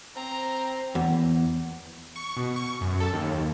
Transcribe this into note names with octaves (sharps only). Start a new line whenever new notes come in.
C4 A#5
E2
C#6
B2
C#6
F#2
A4
D#2